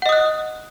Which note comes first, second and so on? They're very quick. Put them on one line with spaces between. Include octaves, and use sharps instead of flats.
F#5 D#5 D#6 F#6